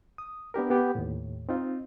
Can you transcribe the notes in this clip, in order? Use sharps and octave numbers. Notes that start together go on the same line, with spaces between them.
D#6
B3 D4 G4 A#4
B3 G4
D#2 A2
C4 D#4 F4